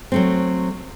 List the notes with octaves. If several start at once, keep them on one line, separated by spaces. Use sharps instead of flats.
F#3 A3 C4